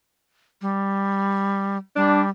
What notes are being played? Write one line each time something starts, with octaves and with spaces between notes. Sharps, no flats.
G3
G3 D4